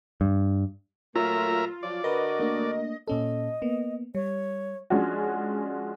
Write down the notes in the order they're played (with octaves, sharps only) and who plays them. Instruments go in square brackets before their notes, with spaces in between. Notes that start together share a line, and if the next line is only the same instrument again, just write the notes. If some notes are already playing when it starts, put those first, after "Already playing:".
[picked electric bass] G2
[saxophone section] A#2 F#3 A3 [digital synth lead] F4 [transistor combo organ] A#4 E5 A#5
[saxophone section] F3 F#3 F4 [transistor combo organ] D5
[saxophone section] D3 F#4 A#4 [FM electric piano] B4 [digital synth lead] D#5
[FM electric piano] A3 A#3 D4
[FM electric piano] A#2 C#4 A4 [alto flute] D#5
[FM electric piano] A#3 B3
[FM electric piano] G3 [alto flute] C#5
[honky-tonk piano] F3 G#3 C#4 D4 F#4